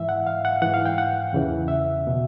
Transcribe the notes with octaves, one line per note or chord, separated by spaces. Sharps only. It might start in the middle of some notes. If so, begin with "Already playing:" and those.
Already playing: G#2 E3 E5
F#5
F5
F#5
G#2 E3 F#5
F5
G5
F#5
E2 C#3 E3
E5
B2